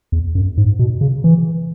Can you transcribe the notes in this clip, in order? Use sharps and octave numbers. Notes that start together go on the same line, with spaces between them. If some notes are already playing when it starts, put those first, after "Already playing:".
E2
F#2
G#2
B2
C#3
E3